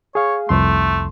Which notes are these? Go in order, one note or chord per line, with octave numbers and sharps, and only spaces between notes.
G#4 C#5 F5
C2 F2 A3 C6